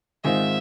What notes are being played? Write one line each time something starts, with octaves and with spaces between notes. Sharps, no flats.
G#2 D#3 G#3 C4 F4 E5